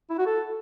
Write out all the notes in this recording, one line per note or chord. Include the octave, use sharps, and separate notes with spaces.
E4
F#4
A4